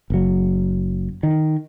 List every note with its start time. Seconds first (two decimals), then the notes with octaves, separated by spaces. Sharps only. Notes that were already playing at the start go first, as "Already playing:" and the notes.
0.10 F#1 F#3
1.23 D#3